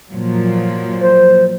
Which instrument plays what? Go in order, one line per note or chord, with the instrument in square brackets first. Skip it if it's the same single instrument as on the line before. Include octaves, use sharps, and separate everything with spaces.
[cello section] A#2 F3 F#3
[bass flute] C5